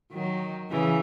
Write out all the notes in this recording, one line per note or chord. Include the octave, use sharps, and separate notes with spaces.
D#3 F#3
C#3 E3